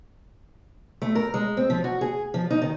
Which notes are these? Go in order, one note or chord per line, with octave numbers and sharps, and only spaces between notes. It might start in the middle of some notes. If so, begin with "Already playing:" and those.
A3
A#4
G#3
C4
F3
F#4
G#4
F3
D#4
D#3